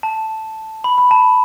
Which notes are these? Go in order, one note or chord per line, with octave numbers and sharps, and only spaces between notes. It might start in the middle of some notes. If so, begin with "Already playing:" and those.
A5
B5
B5
A5